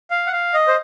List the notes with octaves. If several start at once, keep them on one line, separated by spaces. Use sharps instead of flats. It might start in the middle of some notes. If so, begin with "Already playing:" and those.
F5
F#5
F5
D#5
C5